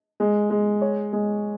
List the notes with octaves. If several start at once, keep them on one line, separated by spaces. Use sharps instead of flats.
G#3
G#3
C#5
G#3